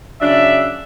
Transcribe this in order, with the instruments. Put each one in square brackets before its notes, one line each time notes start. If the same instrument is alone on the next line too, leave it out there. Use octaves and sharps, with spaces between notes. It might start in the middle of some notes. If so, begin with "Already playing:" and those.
[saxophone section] C#3 F#3 D4 [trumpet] E5